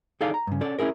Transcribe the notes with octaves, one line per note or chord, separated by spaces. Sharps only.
D#4 G#4 A4 D5 F5
A#5
G2 C#3
C#4 A4 D5
C#4 E4 G#4 A#4